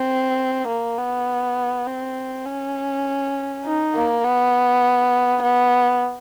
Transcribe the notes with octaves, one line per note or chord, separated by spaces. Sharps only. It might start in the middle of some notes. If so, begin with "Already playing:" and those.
Already playing: C4
A#3
B3
C4
C#4
D#4
A#3
B3
B3